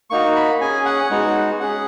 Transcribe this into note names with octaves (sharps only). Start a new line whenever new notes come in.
A#3 D#4 F#4 C#6
B5
C#4 G#4 G#5
F#5
G#3 B3 D#4 F#4
C#4 G#4 F#5